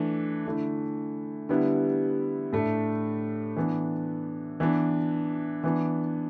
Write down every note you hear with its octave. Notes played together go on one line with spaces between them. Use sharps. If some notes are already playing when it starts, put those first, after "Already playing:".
Already playing: E3 A3 D4
D3 A3 E4
D3 G3 B3 E4
A2 A3 D4
E3 B3 D4
E3 B3 D4
E3 B3 D4